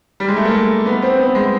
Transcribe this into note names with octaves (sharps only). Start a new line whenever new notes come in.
G3
G#3
A3
A#3
B3
C4
B3
G#3